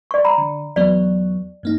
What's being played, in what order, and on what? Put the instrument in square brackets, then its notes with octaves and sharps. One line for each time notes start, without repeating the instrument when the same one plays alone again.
[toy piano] D5 C#6
A#5 B5
[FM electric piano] D3
[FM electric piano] E2 F#3 B3 [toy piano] D5
[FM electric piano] G2 A#3 D#4